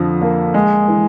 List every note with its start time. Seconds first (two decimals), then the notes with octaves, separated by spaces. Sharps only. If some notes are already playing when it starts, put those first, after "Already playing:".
Already playing: F2 D3 F3
0.22 A#3
0.54 G#3
0.88 E3